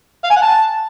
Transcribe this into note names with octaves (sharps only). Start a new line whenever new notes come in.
F5
G#5
F#5
A5